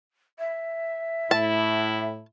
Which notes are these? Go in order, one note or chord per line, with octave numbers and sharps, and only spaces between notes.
E5
A2 E4 A5